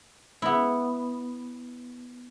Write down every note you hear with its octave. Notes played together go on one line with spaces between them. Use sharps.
B3 E4